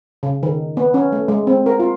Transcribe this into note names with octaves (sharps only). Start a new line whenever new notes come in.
C#3
D#3
B3
C#4
A3
G#3
C4
A#4
F4